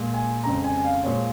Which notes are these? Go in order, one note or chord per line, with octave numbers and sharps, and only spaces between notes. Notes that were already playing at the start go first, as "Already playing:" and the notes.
Already playing: A#2 G#3
G#5
F2 C#3 G#3 A#5
G#5
G#5
F5
A#2 F3 G#3 C#5